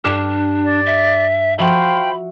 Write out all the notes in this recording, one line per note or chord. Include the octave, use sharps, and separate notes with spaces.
G2 D4 G4 F6
D5
E5
F3 F#4 C5 E5 F5 G5 B5